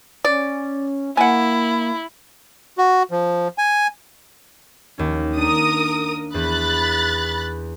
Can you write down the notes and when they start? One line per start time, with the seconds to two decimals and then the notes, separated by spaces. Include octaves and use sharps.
0.25 C#4 D5
1.17 A#3 E4 F#5 G#5
2.78 F#4
3.11 F3
3.58 G#5
4.98 D#2 C#4
5.37 D4 A#4 D#6
6.34 E2 B5 F#6 A6